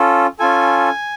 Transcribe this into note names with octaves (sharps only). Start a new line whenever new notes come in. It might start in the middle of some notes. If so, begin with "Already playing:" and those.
Already playing: C#4 F4 A4
C#4 F4 A4 G#5